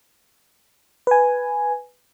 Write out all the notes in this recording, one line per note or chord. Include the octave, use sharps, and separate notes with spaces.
B4 G#5